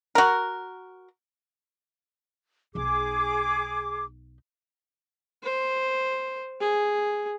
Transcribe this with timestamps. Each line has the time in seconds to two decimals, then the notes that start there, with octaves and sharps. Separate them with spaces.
0.15 F#4 A#4
2.75 B1 D#4 G#4 D6
5.43 C5
6.60 G#4